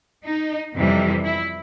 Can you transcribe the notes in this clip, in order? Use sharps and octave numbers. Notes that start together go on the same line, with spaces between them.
D#4
F2 C3 E3 G3
E4